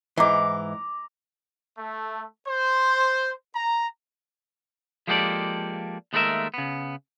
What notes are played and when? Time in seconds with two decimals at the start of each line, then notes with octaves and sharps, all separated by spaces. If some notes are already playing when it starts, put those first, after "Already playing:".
0.17 G#2 E3 A#5 D6
1.78 A3
2.47 C5
3.56 A#5
5.07 F3 G#3 A#3 G4 A4 D5
6.13 D#2 G#3 A3 C#4 A#4 E5
6.54 C#3 B3